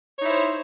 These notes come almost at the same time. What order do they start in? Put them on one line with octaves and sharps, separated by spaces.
C#5 D#4 E4 C5